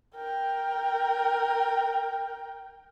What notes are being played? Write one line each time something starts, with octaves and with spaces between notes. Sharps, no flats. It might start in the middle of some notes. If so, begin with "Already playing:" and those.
A#4 G5